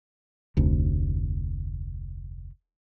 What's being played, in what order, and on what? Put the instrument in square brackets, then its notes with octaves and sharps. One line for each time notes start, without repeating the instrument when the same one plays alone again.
[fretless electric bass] F1 D2